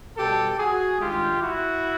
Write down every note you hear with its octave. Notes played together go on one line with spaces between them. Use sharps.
B2 G3 G4 A4
F#4 G#4
G2 D#3 G#3 F4 G4
E4 F#4